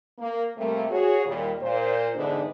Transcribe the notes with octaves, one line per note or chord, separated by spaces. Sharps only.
A#3
C3 G3 A3 A#3
F#4 G#4 C#5
D#2 A#2 G3
A#2 C5
E2 G#2 D3 B3 D4 D#4